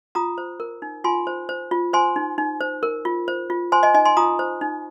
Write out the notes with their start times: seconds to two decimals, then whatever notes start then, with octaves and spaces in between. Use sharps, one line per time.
0.15 F4 A#5 D#6
0.38 C5
0.60 A#4
0.82 D#4
1.04 F4 G#5 C6
1.27 C5
1.49 C5
1.71 F4
1.93 C5 G#5 C6
2.16 D#4
2.38 D#4
2.61 C5
2.83 A#4
3.05 F4
3.28 C5
3.50 F4
3.72 C5 G#5 C6
3.83 D#5 G#5
3.94 D#4 D#5 G#5
4.05 G#5 C6
4.17 F4 A#5 D#6
4.39 C5
4.61 D#4